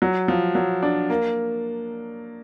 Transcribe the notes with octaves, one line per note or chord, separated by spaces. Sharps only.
F#3
F3
F#3
D4
A#3